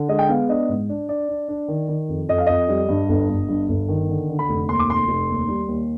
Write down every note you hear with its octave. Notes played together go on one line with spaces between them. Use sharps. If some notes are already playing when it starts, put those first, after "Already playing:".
Already playing: D3
G#3 D#5
G5
B3 F5
D4 D#5
G#2
D4
D4 D5
D4
D4
D#3
D#3
F2
F2 D#5
F5
F2 D#5
G3
G2
G1
G1
G2
G1
D#3
D3
D3
B5
F1
D#2 C6
D6
F1 C6
F1
D#2
G3
D#2